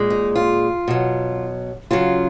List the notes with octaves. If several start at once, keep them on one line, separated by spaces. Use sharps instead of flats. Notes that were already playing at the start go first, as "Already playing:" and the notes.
Already playing: A#2 G#3
D#4
F4
B2 F#3
C#3 F#3 F4